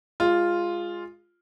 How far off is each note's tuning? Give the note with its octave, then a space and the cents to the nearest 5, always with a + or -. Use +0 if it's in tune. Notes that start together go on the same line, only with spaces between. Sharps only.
G#3 -15 F4 +0